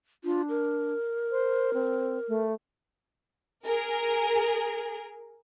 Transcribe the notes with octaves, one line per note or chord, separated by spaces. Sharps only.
D4 F4
A#4
C5
C4
A3
G#4 A#4